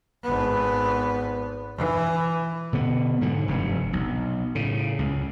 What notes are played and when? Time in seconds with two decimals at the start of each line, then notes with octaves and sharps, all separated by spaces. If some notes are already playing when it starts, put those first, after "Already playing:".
0.23 G#1 B3
1.77 E3
2.73 B2 D3 B3
3.21 G#2 D3 F#3
3.48 F1 G2 C3
3.93 B1
4.55 A2 C#3
4.99 C#2